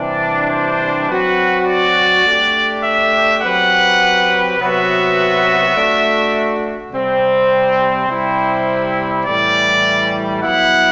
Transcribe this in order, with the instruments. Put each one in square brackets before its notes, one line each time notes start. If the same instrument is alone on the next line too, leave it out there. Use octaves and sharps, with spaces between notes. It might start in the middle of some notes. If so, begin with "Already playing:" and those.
Already playing: [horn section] C3 E3 G3 D4 [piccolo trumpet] D5
[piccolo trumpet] C5
[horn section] F#3 C4 F#4 [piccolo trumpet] B4
[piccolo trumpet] D5
[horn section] A3 D4 G4
[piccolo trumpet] E5
[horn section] F#3 C4 G4 B4 [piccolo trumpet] F#5
[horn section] C3 F#3 B3 F#4 B4 [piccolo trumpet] E5
[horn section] A3 D4 F#4
[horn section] C3 G3 C4 [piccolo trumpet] C5
[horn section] C3 G3 C4 E4
[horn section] A2 E3 G3 [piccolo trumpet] D5
[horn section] F#3 B3 E4 [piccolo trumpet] F#5